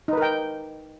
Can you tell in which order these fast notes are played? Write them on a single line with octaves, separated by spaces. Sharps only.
D#4 B4 A#4 G5